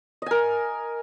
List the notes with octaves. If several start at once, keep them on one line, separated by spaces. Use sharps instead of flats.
A#4 D#5 G#5